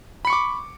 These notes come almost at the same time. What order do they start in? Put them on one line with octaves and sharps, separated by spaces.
B5 C#7 C#6 D6